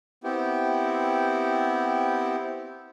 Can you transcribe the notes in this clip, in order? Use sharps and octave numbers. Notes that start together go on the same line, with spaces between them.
B3 C4 E4 G4